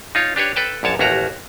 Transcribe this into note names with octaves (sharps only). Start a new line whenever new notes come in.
D#4 F4 C#5
D4 G4 B4 C#5
A4 B4 G5 A5
A#1 F#2 C#5 A5
A1 D#2 C#4 F#4 G4 A#5